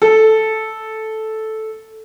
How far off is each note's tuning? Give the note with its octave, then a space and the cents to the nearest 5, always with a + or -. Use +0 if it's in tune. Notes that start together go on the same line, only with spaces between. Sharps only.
A4 -5